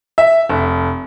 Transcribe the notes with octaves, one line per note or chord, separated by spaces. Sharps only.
E5
F1